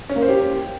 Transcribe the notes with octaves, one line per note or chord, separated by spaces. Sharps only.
C#4
A#3
C5
G4